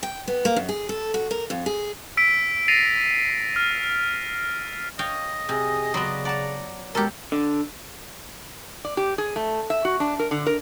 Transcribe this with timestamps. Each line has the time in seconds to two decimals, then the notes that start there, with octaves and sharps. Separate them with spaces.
0.03 G5
0.28 B3
0.45 A#3
0.56 F#2
0.69 G#4
0.89 A4
1.14 F#4
1.31 A#4
1.50 F2
1.66 G#4
2.17 E6 B6 D7
2.68 A6 A#6 C7 D#7 F7
3.56 F6
4.99 C#5 D#5 F5 G5
5.49 C3 G#4
5.94 C#3 F#3 B3 D5 B5 C6
6.25 D5 F#5 A5 A#5 D6
6.95 B2 G#3 G4 A4 A#4
7.32 D3
8.85 D5
8.97 G4
9.18 G#4
9.36 A3
9.70 E5
9.85 F#4
10.00 D4
10.19 A#4
10.31 D3
10.46 A#4